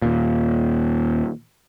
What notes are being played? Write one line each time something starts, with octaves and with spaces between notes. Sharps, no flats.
D#2 A#2